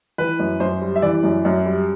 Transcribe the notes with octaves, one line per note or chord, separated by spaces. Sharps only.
E3 B4
F#2
F#2 C5
G3
E5
E3 D5
F#2
F#2
G3